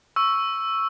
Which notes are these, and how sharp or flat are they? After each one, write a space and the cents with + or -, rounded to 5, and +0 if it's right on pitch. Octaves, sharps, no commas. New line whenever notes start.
C#6 +0 E6 +0